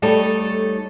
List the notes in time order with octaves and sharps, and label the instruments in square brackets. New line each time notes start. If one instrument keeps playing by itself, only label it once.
[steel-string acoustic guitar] G3 A3 D#4 A4 C#5